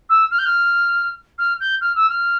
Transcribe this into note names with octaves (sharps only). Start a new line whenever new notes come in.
E6
F6
G6
F6
F6
G6
F6
E6
F6